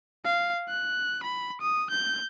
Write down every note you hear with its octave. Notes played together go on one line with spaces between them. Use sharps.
F5
F#6
B5
D#6
G6